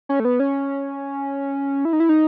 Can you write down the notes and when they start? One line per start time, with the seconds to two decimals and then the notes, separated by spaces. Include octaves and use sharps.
0.09 C#4
0.20 A3
0.25 B3
0.40 C#4
1.85 E4
1.93 D#4
2.00 E4
2.09 D#4